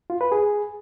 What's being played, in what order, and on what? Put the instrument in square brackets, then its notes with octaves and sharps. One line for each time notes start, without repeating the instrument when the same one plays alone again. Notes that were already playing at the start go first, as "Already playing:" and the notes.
[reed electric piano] F4
B4
G#4